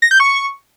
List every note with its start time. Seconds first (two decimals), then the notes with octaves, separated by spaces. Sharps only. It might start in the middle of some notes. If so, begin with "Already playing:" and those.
0.02 A#6
0.11 G6
0.20 C#6